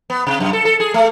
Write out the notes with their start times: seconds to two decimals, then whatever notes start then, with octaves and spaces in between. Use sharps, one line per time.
0.10 B3
0.27 C3
0.40 F#2
0.53 A4
0.65 A4
0.80 G#4
0.94 A3